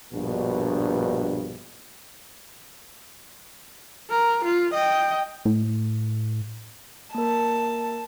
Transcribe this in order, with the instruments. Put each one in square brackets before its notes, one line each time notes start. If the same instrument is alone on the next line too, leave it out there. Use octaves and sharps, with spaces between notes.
[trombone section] A#1 G2 B2
[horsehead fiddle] A#4
F4
D#5 G5
[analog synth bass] A2
[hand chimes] A#3 A#4 [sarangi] A5